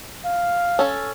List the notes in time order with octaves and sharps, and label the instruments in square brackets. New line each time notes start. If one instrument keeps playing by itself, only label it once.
[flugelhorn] F5
[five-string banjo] C#4 A4